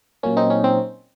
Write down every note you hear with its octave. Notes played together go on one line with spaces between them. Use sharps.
A#2 F#3 A#3 C#4
C4 D#4
C#4
C4